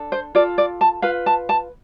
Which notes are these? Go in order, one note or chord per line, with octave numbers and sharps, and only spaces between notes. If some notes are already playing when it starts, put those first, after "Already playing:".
Already playing: D4 A4
C5
F4 A4 D5
D5
A5
F4 B4 F5
A5
A5